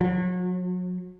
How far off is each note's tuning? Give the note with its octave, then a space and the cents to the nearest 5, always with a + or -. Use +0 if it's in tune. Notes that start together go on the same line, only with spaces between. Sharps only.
F#3 -35